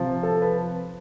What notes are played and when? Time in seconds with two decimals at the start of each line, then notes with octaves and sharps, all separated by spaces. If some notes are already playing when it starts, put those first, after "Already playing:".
Already playing: C3 F3
0.23 A4
0.42 B4